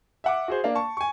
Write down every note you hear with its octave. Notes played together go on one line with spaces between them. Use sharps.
E5 F#5 D6
F#4 G#4 C5
A#3 D4 F5
A5 C#6
G#5 C#6